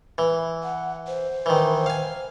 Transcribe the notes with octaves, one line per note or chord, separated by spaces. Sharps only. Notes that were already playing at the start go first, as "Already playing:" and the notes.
E3
F#5
C5
D#3 E3
F5 G#5